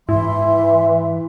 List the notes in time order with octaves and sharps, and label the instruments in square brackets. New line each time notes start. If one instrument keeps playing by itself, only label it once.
[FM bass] G#2 [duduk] E3 [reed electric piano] E4 [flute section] E5 C6